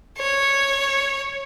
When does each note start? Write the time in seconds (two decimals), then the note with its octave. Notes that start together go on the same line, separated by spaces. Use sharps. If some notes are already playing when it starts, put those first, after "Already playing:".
0.18 C#5